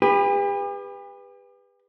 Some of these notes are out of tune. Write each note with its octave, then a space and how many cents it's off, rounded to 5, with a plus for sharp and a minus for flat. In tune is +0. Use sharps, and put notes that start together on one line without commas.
G4 +45 B4 +0